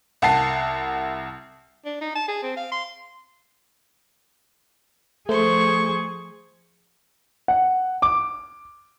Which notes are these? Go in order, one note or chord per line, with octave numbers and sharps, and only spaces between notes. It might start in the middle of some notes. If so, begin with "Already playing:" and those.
C2 F#5 A5 C7
D4
D#4
A5
G#4
C4
F5
C6
F3 A3 G#4 C5 C#6
F#5
D6